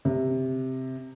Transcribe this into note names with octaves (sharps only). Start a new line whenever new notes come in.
C3